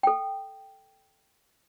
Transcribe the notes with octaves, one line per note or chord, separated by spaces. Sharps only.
A4 G5